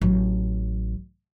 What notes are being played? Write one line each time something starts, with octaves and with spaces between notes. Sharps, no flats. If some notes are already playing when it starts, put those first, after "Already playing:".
A1 F#3